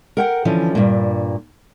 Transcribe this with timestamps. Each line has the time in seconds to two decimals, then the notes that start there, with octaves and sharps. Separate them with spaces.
0.17 A#4 F#5 G5
0.45 D3 E3 F3 C#4
0.75 G2 A#2